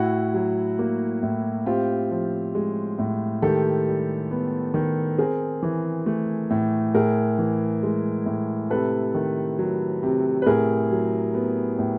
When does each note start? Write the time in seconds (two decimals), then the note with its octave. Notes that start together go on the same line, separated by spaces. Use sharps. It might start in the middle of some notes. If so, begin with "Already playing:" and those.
Already playing: A2 E4 F#4
0.34 F#3
0.79 A#3
1.23 A2
1.66 C4 F4 G4
2.11 F3
2.55 G#3
2.99 A2
3.42 D#3 G4 A4
3.87 G3
4.31 B3
4.74 D#3
5.18 C4 G#4 A#4
5.63 E3
6.06 A3
6.50 A2
6.94 A2 G#4 A#4
7.39 E3
7.83 G#3
8.26 A2
8.70 C3 A4 B4
9.15 D#3
9.59 F#3
10.03 C3
10.42 B4
10.46 A2 G#4 A#4
10.91 F#3
11.35 B3
11.79 A2